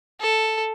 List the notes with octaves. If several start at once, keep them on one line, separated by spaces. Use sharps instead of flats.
A4